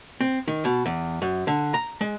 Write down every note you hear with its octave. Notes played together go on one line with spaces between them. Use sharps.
C4
D#3
B2
E2
F#2
D3
A#5
G#3